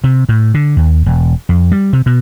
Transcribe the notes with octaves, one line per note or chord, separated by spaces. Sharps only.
C3
A2
D3
D#2
E1
F2
G3
C3
B2